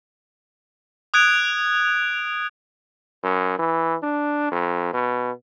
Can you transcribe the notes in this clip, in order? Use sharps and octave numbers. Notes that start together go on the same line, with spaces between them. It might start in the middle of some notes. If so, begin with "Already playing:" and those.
D#6 F#6 G#6 D7 F7
F#2
E3
D4
F2
B2